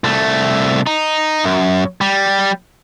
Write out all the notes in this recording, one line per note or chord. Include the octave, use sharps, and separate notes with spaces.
C2 A3
D#4
F#2
G3